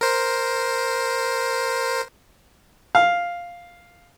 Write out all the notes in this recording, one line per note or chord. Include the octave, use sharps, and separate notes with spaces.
A#4 C5
F5